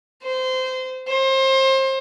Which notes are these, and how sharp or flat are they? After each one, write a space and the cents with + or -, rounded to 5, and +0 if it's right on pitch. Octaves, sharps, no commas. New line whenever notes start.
C5 -20
C5 +30